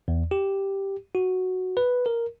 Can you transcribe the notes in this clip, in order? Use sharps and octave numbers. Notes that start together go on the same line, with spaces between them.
E2
G4
F#4
B4
A#4